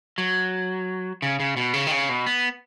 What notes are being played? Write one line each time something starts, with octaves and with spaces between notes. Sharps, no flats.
F#3
C#3
C#3
B2
C#3
D#3
C#3
B2
B3